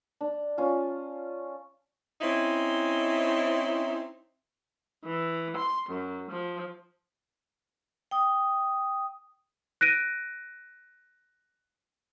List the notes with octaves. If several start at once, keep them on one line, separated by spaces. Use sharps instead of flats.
D4
C#4 F4
C4 C#4 D#4 E4
E3
C6
F#2
F3
G5 D#6
F#6 A#6 D7 D#7